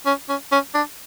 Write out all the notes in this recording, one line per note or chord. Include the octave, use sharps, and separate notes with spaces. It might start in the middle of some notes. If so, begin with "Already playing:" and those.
C#4
C#4
C#4
D4